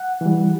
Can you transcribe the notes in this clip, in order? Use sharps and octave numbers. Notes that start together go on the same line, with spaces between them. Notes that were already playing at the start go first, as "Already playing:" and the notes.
Already playing: F#5
E3 G3